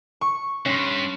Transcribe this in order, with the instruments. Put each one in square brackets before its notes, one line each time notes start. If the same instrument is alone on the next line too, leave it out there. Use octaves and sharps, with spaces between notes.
[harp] C#6
[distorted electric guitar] G2 [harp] C#4 C6